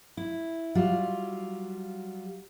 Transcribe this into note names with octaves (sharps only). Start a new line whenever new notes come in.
E4
F#3 G3 F4